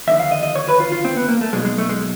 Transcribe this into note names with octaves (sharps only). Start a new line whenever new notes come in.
D#2 D3 F3 E5
F5
D#5
D#5
C#5
B4
F4
F4
C4
B3
A#3
A3
B1 B2 G#3
G#3
A3
G#3